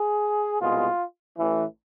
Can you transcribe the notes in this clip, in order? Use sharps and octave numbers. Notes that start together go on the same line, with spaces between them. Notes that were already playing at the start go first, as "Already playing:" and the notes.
Already playing: G#4
C2 B2 G#3 B3 F4
A1 A2 E3